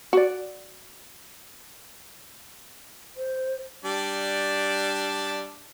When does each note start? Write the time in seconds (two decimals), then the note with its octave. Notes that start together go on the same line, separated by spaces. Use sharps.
0.13 F#4 D5
3.17 C5
3.85 G3 D4 D5